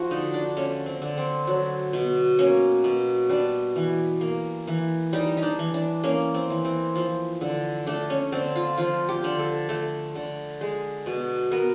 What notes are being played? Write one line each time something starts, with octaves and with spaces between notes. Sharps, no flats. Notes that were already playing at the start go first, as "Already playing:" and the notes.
Already playing: F3 F#4
D3 D#4
D4
A3 C#4
C4
D3
C4
F#3
B2
A#3 C#4
B2
G3 D4
E3
A#3
E3
G3 D#4
D#4
D4
E3
D4
A#3 C#4
C4
E3
C4
F3
D3
A3 D4
C#4
D3 C4
F4
F3 F4
G4
D3
A4
A3
D3
G#3
B2
B3 A#4